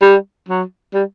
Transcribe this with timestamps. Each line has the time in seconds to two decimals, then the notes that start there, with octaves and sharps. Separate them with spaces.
0.01 G3
0.48 F#3
0.94 G3